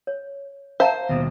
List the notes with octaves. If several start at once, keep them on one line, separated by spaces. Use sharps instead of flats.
C#5
C5 E5 F5 A5 A#5
D#2 B2